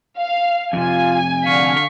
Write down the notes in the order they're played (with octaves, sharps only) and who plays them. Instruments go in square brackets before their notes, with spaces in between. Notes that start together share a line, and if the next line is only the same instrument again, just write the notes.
[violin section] F5
[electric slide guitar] F2 C3 [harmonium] F4 [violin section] G#5
[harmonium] D3 F5 [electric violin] C#6 B6